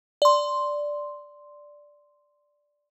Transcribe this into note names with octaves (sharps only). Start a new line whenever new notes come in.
D5 C6